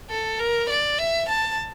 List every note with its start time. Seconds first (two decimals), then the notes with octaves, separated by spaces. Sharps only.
0.10 A4
0.39 A#4
0.70 D5
0.99 E5
1.29 A5